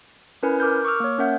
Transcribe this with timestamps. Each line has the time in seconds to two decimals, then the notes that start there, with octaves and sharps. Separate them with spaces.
0.43 C#4 E4 A#4 B4 G#5
0.60 A#4 D6 F6 G6
0.85 C#6 D6 E6 F6
1.00 A#3 C#5
1.18 C#4 A#4 E5 F#5 G6